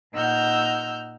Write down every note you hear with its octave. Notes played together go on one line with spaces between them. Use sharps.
A#2 D#4 F#5 E6 F6 G6